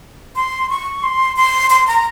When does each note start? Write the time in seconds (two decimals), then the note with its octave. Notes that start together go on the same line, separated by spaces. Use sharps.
0.36 C6
0.70 C#6
1.03 C6
1.36 C6
1.70 C6
1.87 A#5